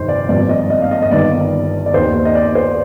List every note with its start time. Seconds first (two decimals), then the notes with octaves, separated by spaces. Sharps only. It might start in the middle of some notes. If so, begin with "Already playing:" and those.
Already playing: G1 F2 C3 D#3 C5
0.08 D5
0.29 G#1 G2 F3 D5
0.49 D#5
0.70 D#5
0.82 F5
0.91 D#5
1.02 D#5
1.11 G1 G2 D#3 D5
1.86 D5
1.94 D#2 D#3 C5
2.25 D#5
2.35 D5
2.55 C5